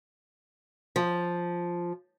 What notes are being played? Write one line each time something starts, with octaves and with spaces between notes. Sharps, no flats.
F3